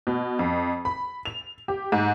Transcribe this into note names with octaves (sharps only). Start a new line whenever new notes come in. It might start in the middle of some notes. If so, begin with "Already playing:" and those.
B2
F2
B5
F7
G4
G#2